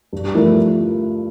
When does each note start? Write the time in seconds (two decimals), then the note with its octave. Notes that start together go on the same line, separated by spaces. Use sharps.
0.13 G2
0.35 F3 A3 E4 A#4